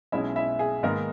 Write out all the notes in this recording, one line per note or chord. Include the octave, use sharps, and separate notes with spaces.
B1 B2 G#3 C#4 E4 E5
E4 E5
G#4
G#2 D#3 G#3 A#3 B3 A#4